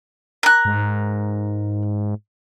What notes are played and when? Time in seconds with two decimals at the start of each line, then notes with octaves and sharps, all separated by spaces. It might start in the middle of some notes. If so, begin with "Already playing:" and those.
0.43 A#4 F#6
0.65 G#2